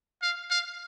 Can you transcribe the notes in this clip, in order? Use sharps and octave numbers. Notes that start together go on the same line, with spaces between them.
F5
F5